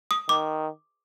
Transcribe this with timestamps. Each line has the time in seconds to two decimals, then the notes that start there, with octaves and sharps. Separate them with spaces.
0.11 D#6
0.29 D#3 D6